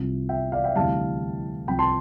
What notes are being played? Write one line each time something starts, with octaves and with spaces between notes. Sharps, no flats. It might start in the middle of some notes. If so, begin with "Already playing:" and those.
Already playing: C2 C3 F3
E5 G5
D5 F5
E5 G5
D2 C3 E3 G3 F5 A5
C2 C3 F3 G5 B5
A5 C6